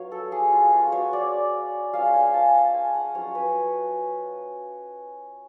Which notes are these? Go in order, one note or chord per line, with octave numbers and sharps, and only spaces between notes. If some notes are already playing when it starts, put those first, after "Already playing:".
Already playing: F#3 B3 F4 C#5 F5
A4
G#4
F4
G#3 C#4 F4 F#4
C#5
D5
G#3 C#4 F4 F5
G#5
A5
A5
G#5
F#5
F#3 C#4 F4 C#5
B4